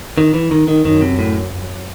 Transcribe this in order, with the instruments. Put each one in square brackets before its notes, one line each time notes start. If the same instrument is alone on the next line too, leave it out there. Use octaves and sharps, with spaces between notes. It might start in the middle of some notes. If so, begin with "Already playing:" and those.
[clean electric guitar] D#3
E3
D#3
D#3
[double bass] F#2 [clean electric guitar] D#3
[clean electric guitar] C3
A2
[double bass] F#2